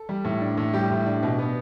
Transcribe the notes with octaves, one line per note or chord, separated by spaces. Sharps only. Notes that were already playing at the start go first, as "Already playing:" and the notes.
Already playing: A4
G3
A2
D4
A2
G3 G4
A2
D4
B2
B3